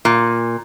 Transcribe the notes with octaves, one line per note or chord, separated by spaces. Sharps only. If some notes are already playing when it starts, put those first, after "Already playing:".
A#2